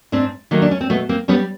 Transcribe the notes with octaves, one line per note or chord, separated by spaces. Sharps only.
G#2 C4 D4
D#3 F#3 A3 A#3
D4
C#4
C4
B2 A3 B3
A#3 C4
G3 B3 C#4